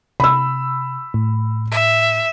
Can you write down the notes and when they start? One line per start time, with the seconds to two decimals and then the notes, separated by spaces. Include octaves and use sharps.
0.20 C3 B5 E6
1.14 A2
1.71 E5